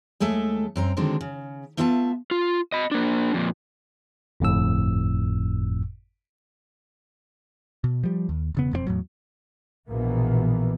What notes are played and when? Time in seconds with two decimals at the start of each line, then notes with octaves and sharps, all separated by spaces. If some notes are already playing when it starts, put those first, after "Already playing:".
0.20 D#2 G#3 A3 A4 E5
0.76 F#2 C4 A#5
0.97 D3 D#3 F#3 G#3 C4 D4
1.21 C#3
1.77 A3 B3 F4 E5 F#5 A5
2.31 F4
2.72 D#5 B5
2.91 A#3 D4
3.34 F2 A#2
4.40 G1 F2 A2 E6
7.84 B2
8.03 F3 G3
8.29 D#2
8.55 E1 C#3 B3
8.71 E1 F2 F3 C4
8.87 E2 A2 F#3
9.89 A#1 B2 E3 A#3 B3